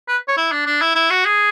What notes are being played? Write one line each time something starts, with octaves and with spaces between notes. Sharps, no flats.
B4
C#5
E4
D4
D4
E4
E4
F#4
G#4